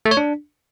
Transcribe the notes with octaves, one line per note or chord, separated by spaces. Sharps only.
A3
C#5
D4